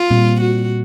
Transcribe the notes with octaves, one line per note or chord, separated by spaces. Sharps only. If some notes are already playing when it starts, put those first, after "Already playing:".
Already playing: F4
A#2 G3 C4
F#4